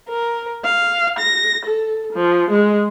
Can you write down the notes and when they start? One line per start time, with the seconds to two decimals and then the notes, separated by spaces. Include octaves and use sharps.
0.10 A#4
0.63 F5
1.17 A#6
1.65 A4
2.12 F3
2.49 G#3